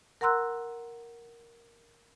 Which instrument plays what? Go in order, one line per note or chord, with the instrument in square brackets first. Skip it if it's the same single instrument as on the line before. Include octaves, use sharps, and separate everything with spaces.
[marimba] A#4 F#5 A#5 C6 E6 F#6